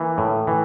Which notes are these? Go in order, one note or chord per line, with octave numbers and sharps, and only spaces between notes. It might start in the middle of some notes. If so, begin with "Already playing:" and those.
Already playing: E3 A#3
A2
E3